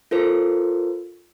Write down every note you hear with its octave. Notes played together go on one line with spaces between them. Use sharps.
F4 A4 A#4 C5